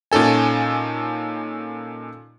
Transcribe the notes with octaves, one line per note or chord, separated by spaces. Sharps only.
A#2 C#4 D#4 A4 G#5